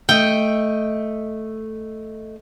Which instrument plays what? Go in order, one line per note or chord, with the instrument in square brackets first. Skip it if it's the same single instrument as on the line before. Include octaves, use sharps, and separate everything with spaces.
[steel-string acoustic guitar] A3 D#5 [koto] G5